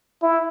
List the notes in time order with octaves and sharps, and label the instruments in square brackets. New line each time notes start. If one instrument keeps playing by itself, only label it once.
[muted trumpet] E4